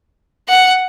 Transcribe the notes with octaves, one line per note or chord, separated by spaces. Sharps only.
F#5